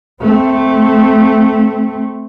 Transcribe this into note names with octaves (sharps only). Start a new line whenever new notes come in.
A3 C4